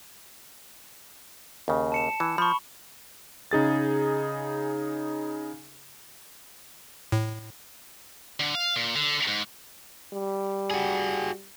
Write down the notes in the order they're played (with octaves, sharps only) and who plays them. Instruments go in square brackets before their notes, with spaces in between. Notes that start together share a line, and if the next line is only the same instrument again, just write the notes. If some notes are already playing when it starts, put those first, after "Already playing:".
[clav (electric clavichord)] D#2 C#3
[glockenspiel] A5 C#7 E7
[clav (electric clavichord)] E3
[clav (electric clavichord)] F3 [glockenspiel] B5 C#6
[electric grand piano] C#3 D#4 G#4 A6
[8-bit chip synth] A2
[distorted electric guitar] D3
F5
A#2
D3
G#2
[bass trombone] G3
[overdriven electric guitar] F#4 G#4